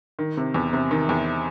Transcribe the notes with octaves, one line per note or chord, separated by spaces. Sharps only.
D#3
C3
E2
C3
D#3
E2